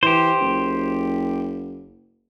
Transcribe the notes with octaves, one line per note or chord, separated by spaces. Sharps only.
E3 G4 C5
F#1